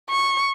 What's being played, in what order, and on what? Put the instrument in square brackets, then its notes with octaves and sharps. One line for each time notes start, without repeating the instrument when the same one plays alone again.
[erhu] C#6